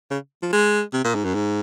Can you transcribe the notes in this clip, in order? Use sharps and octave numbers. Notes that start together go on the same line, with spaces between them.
C#3
F3
G#3
C3
A#2
G#2
F#2
G#2